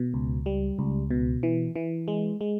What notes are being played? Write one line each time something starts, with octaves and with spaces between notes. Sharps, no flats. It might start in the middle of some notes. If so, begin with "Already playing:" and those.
Already playing: B2
C#2
G3
C#2
B2
E3
E3
G#3
G#3